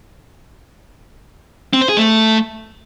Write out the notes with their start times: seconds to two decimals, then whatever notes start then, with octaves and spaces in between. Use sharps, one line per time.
1.73 C4
1.81 C5
1.89 G#4
1.97 A3